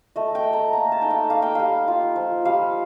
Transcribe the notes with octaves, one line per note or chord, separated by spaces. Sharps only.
A3 D#5
G5
A3
A#5
A#3 A#5
A5
D#4 G5
F5
A#3 F5
G5
G3 F5
F4
F3
G3 F5